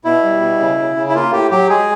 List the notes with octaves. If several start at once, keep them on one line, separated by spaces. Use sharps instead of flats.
B2 E4
G3
B2
C#3
C#3
C#3
E4
A#3 F4
A2 G4
F#3 G4
G#3 G#4